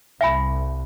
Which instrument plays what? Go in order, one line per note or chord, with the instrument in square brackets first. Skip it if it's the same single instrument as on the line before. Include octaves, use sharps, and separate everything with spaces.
[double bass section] C2 [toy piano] E5 G#5 B5